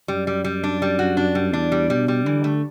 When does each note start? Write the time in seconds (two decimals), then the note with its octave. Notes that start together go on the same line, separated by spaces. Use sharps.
0.08 F#2 G3
0.27 G3
0.45 G3
0.64 D4
0.82 G3
0.99 F#4
1.17 D4
1.35 G3
1.53 E2 D4
1.72 G3
1.90 B2 G3
2.08 G3
2.25 D3 E3
2.44 A3